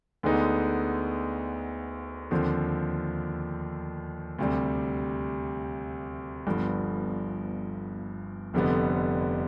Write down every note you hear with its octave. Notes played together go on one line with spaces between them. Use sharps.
D2 D3 G#3 B3 D#4
D#2 D3 F3 C4
D2 C3 G3
G1 G2 F3 B3
F1 F2 D3 G3 B3